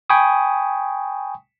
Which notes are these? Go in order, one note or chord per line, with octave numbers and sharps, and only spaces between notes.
G5 G#5 B5 C#6 D#6